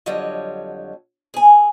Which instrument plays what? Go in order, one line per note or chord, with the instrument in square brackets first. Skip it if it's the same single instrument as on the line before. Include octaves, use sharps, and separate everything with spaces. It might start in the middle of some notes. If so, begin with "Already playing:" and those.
[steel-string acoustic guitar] F2 D3 F#3 G3 C#5 D#5
G#4 G#5